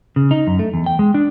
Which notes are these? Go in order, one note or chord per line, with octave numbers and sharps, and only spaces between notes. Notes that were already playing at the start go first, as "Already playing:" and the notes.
C#3
D#4
F#2
A3
E2
G5
G#3
D4